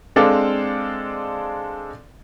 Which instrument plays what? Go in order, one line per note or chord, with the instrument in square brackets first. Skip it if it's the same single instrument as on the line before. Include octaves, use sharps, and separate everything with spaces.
[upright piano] G#3 C4 D4 A4 D5 F5